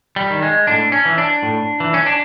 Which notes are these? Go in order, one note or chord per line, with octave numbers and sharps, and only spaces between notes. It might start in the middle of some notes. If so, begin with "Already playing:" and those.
G3
D#3
G#3
A2 D4
C#4
E3
D4
A2
E3
C#4
D4